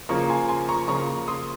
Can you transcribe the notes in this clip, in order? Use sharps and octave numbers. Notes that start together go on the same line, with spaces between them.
C#3 F3 A#3 A#5 C#6
G#5 C6
G#5 C6
A#5 C#6
C#3 F3 A#3 A#5 C#6
C6 D#6